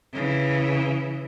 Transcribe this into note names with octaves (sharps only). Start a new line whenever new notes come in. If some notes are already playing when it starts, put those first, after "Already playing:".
C#3 E3